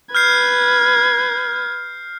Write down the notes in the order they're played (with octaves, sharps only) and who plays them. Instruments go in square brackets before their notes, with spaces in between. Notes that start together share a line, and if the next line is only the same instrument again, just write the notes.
[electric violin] B4 G#6 [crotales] F6 G6 C7